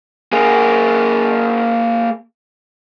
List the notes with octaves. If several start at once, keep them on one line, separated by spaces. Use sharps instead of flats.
A#3 G#4